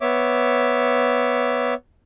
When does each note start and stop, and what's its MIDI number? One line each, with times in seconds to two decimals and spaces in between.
0.01 1.74 59
0.01 1.74 73
0.01 1.74 76
0.01 1.74 86